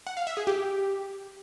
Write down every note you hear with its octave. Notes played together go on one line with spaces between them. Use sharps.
F#5
F5
E5
G#4
G4